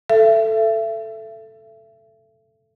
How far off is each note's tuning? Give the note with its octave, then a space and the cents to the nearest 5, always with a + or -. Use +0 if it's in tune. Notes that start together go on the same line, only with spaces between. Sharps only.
A4 +0 E5 +30